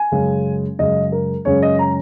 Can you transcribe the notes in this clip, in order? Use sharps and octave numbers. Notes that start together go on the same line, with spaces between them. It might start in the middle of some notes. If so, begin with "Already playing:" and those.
Already playing: G#5
F#2 C#3 G#3 C#4
F#2 C#3 G#3 C#4 D#5
A#4
F#2 C#3 G#3 C#4 C#5
D#5
A#5